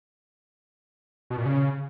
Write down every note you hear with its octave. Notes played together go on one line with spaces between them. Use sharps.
B2
A#2
C#3